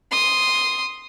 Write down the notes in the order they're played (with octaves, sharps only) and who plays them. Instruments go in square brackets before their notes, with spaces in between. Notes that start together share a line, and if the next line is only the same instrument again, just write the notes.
[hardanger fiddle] C6 D#6